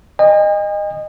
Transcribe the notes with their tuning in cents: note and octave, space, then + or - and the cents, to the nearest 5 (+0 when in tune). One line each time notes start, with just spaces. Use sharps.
D#5 -20 G#5 -45